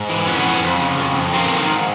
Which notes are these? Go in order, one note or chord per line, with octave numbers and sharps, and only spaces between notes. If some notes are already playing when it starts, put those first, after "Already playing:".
Already playing: G#2
E3
F2 B3 C#4
F2
F2
C#3
F2
F2
D#3 A#3 C4
D#3
G#2